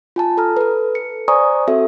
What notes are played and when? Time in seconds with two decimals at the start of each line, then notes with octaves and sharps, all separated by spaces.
0.16 F4 G#5 A5
0.37 A4 A#5 F6
0.57 A4 B4
0.95 C#7
1.28 C5 D5 G#5 A#5 C#6 D#6
1.68 C4 F#4 A4 E5